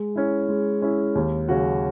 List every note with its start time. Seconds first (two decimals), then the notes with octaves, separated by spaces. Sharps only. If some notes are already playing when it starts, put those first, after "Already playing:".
Already playing: G#3
0.16 C#4 E4
0.49 G#3
0.82 C#4 E4
1.15 D#2
1.48 C#3 F#3 C#4 F#4